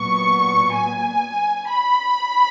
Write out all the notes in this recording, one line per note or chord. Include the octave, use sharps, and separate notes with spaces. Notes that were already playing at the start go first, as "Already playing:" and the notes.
Already playing: A#2 F#3 B3 C#6
G#5
B5